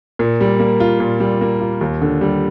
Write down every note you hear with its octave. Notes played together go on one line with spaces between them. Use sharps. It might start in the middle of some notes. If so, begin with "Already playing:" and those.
A#2
G3
A#3
F4
A#2
G3
A#3
F4
D#2
D3
G3